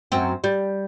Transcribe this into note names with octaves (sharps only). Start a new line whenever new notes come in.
F#2 C4
G3